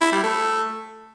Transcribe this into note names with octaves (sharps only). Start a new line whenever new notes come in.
E4
G3
A3